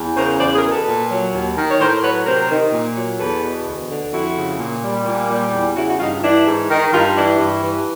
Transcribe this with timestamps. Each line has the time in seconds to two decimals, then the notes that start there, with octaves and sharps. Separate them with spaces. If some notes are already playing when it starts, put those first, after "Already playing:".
Already playing: E2
0.16 C#3 A#4 C5
0.39 E2 C5 D5
0.54 G#4 A#4
0.63 B2
0.71 A4 B4
0.86 A#2
1.10 F#3
1.33 D#2
1.57 D#3
1.69 C#5
1.79 A2 A#4 C5
2.02 F#3 B4 C#5
2.25 C3 A#4 C5
2.49 D#3
2.72 A#2
2.96 F#3
3.19 E2 A4 B4
3.43 B2
3.66 D2
3.90 D3
4.12 F2 E4 F#4
4.37 C#3
4.59 A#2
4.83 G3
5.06 A#2
5.30 G3
5.53 E2
5.75 C#3 E4 F#4
5.89 F#4
5.99 G2 D#4 F4
6.22 E3 D4 E4
6.46 G#2
6.70 D#3
6.92 G2 D#4 F4
7.15 E3 D4 E4
7.39 G2
7.62 E3